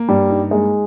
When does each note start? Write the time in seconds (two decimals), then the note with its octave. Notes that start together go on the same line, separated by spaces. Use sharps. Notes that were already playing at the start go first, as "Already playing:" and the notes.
Already playing: A#3
0.09 G2 G3
0.30 D#4
0.51 G#3 A#3